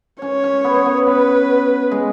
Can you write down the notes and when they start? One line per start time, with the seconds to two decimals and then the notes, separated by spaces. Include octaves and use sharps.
0.22 C#4 C#5
0.44 C#4
0.64 B3
0.86 B3
1.07 B3 B4
1.91 G#3